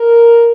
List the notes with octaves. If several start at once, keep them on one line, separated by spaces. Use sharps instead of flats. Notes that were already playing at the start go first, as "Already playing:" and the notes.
Already playing: A#4